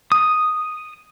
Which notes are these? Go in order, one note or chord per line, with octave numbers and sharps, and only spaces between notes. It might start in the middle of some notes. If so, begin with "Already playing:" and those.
D#6